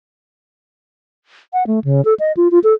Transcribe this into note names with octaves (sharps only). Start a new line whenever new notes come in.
F#5
A3
C#3
A4
D#5
F4
F4
A4